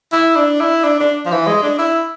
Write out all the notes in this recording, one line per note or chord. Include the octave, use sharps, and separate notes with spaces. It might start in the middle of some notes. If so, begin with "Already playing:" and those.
E4
D4
E4
D4
D4
F3
E3
G#3
D4
E4